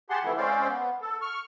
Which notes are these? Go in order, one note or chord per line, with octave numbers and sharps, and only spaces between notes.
G4 G#4 F#5 A5 C6
C3 E3 F3 A3 B3 E4
G#3 C4 C#4 C5 D5 F5
B3
A4
C#6 F6